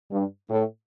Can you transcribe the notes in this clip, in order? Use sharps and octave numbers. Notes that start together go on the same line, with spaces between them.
G2
A2